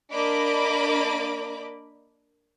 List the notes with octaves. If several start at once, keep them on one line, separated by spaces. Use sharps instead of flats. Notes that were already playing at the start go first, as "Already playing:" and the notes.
A#3 D4 D#5 B5 D6